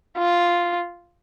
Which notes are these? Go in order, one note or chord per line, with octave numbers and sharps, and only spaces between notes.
F4